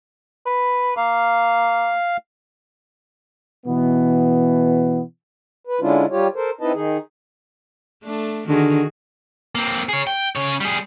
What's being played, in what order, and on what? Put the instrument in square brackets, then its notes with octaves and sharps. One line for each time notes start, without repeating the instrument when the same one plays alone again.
[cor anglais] B4
[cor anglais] A#3 [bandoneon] F5
[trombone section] B2 E3 B3
[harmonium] B4
D3 G#3 C#4 D4 E4 F4
G3 F4 G4 C#5
A4 A#4 C5
C4 D#4 E4 B4 D#5 A5
D#3 D#4 G#4
[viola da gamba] A3 D4
[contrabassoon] D3 [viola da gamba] D#3 F#4 G#4
[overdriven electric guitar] A#3 C4
G#4 C#5
G5
C#3 C#5
G3 G#4